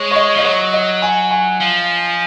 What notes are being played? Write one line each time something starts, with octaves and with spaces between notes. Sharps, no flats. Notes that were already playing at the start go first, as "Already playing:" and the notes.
Already playing: G#3 C#5
C#5
D#5
F3 D#5
F#3 C#5
D#5
G#5
G#5
F3